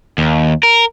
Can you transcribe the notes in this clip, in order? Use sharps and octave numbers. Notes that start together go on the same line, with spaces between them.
D#2
A#4